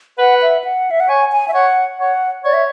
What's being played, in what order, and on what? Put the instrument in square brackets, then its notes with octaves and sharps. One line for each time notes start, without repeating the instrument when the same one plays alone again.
[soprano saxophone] B4 [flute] F#5
[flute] E5
F#5
E5
F#5
[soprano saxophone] C#5 [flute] G#5
[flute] G#5
E5
[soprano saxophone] C#5 [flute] F#5
[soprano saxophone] C#5 [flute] F#5
[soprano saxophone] C#5 [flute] D5
[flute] E5